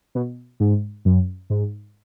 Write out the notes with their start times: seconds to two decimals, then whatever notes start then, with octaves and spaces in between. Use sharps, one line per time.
0.15 B2
0.60 G#2
1.05 F#2
1.50 G#2